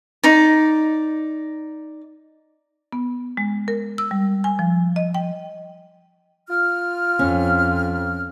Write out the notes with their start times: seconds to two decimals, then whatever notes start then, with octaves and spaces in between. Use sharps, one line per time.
0.24 D#4 D5
2.92 B3
3.37 G#3
3.68 A#4
3.98 E6
4.11 G3
4.44 G#5
4.59 F3
4.96 D#5
5.15 G5
6.49 F4 F6
7.19 F2 C#4